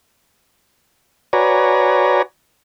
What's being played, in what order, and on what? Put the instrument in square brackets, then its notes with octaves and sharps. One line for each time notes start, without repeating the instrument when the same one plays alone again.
[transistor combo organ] F#4 B4 C#5 D5 G#5 A#5